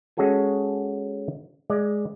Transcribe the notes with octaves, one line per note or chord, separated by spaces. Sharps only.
G#3 C#4 F#4 G#4 A4 G#5
G#3 D5